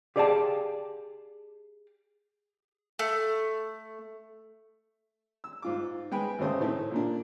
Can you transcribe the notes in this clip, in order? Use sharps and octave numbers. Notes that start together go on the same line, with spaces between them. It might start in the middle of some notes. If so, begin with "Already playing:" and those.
G4 G#4 D5 F5 G5 A5
A3
E6
G#2 F4 D6
G#3 B3 G5 G#5 B5
G#1 D2 C#3 A3 C5 D#6
A2 D#3 A3 C4
A#2 A#3 D4